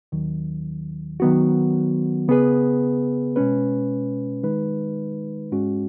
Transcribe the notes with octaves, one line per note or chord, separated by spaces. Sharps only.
D#2 D#3 F#3
D#3 F#3 B3 F#4
C#3 B3 G#4 B4
B2 G#3 C#4 B4
D#3 G#3 D#4 B4
G#2 G#3 C#4 F#4